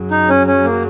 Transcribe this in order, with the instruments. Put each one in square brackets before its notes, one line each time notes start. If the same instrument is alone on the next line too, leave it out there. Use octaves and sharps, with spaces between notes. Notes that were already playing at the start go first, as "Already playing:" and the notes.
Already playing: [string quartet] F#2 C#3 F#3
[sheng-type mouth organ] D#4
C#4
C#4
A#3